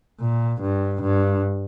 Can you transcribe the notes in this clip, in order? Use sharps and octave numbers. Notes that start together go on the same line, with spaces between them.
A#2
G2
G2